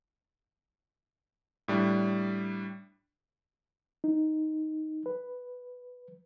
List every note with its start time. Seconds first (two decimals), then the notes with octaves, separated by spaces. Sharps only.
1.68 A2 G3 D4
4.04 D#4
5.06 B4